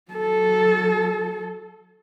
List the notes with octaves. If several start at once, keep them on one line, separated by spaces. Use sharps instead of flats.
F#3 A4